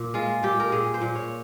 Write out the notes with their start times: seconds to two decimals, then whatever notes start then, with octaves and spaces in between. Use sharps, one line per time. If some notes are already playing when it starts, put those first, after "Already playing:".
Already playing: A#2
0.14 G#3 F4
0.43 A#2 G4
0.60 A#4
0.72 A#2 G#4
0.94 C5
1.02 A#2
1.15 C#5